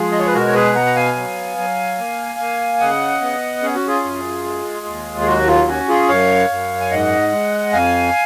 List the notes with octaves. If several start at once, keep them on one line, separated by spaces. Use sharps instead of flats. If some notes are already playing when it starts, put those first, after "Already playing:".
Already playing: F3 G#3 F4 G#4
D#5
C#5
B4
B2 F#4 A#4
C#5
G#4 B4
B3 F#5 A#5
A#5
F5 G#5
F#3
F#3
A#3
A#3
C#3 D#5 F#5
B3
C#4 G#4
F#4
F4 G#4
F#2
G#3
D#2
G#4
F#3 F#4
F4
C#4 F#4
F4 G#4
F#2 C#5 F5
F#2
G#5
G#2 D#5 F#5
G#3
F2 F5 G#5